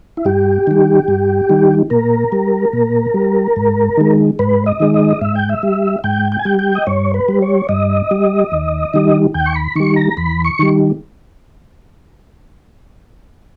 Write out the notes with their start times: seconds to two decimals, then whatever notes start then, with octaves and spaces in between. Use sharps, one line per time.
0.17 E4
0.25 G2 G4
0.67 D#3 G3
1.08 G2
1.49 D#3 G3
1.90 A#2 A#4
2.32 G3
2.73 A#2
3.14 G3
3.56 G#2
3.97 D#3 G#3
4.39 G#2 B4
4.66 D#5
4.80 D#3 G#3
4.94 D#5
5.21 G#2 E5
5.35 G5
5.49 E5
5.63 G3
6.04 G#2 G5
6.32 G5
6.39 G#5
6.45 G3 G5
6.59 G5
6.75 D#5
6.87 G2 C#5
7.14 B4
7.28 G3
7.42 C#5
7.69 G2 D#5
8.11 G3
8.52 D#2
8.94 D#3 G3
9.34 D#2 G5
9.46 C#6
9.55 B5
9.75 D#3 G3 C#6
9.96 A#5
10.17 E2 B5
10.45 C#6
10.59 D#3 G3